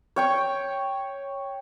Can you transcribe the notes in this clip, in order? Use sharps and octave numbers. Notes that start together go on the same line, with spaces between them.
C#5 G5 C#6